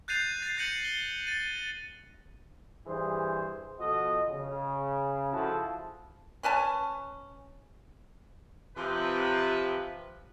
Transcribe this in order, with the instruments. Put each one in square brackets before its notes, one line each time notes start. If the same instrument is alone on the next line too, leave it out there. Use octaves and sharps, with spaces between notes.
[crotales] F#6 G6 A6 C7 D#7 F7
A6 C7
G6 A#6 C#7 D#7 F#7
G7
A6 D#7
[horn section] G2 E3 G#4 C5
B2 F3 F#4 A4 D#5
C#3
F3 E4 F#4 G#4 A4 A5
[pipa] C#4 B4 G#5 A5
[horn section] C3 F3 B4